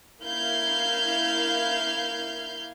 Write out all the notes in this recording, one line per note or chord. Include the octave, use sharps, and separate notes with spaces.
A#3 E4 F5 F6 G6 G#6